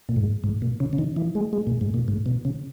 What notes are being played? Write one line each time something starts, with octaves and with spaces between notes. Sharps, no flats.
A#2
G#2
G#2
A#2
C#3
C#3
D#3
E3
G#3
G#3
A#2
G#2
A#2
G#2
B2
C#3